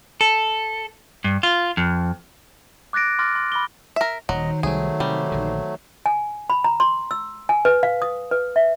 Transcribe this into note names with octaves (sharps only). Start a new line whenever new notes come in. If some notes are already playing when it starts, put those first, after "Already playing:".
A4
G2
F4
F2
D6 F#6 A6 A#6 D7
C6 D6 F6 A6 A#6
C6
B5 D6 G7
A#4 E5
D#1 D#3 F#3 C5 D#5
C2 F#3 G3 A3 G#4
C3 G3
A#1 D3
G#5
B5
A#5
C6
E6
G#5
B4
F5
D#6
B4
E5